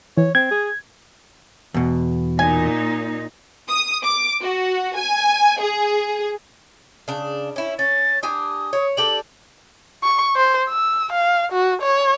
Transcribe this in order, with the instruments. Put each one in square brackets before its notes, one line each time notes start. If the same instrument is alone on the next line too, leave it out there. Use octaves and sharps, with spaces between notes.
[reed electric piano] E3 [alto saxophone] C#5
[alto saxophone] C4 [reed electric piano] G#6
[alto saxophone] G#4
[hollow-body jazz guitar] E2 B2
[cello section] A#2 D#4 [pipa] G#5
[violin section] D#6
D6
F#4
G#5
G#4
[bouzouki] C#3 D4
C#4 E4
[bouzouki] C#4 [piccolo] A6
[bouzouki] D4 G4 G#5 [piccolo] D#6
[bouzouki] C#5
[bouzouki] D4 G4 A4 [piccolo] F#7
[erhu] C#6
C5
E6
F5
F#4
C#5